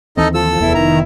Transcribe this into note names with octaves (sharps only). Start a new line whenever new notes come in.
D#2 E3 C4 D#4 A4 D#5
F3 A4 E6
F1 E2 B3 E4
D#3 A#5